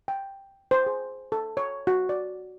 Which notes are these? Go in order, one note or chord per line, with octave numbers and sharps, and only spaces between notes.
G5
C5
G#4
A4
C#5
F#4
D5